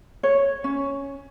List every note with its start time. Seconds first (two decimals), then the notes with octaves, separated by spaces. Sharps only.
0.23 C#5
0.64 C#4